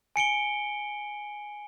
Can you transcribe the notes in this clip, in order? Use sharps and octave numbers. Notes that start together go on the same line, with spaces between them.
G#5 C#7 D7 G7